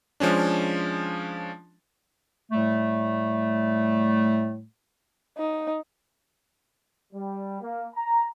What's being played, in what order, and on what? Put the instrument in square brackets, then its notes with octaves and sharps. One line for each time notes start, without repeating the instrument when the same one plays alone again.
[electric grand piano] F3 G#3 C#4 D4
[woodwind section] A2 G3 A3
[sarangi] D#4
[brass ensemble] G3
A#3
A#5